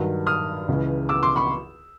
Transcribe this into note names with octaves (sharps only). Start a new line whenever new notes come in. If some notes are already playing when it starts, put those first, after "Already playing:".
Already playing: G2 D#3 F#3
D#6 F6
C#2 C#3 E3
D6 E6
C6 D6
B5 C#6